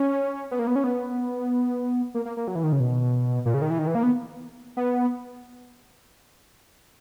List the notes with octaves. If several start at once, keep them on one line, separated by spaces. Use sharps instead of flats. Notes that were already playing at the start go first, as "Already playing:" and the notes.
Already playing: C#4
B3
A#3
B3
C#4
B3
A#3
A#3
A#3
F#3
E3
D#3
C#3
B2
A#2
C#3
D#3
E3
D#3
E3
A#3
B3
B3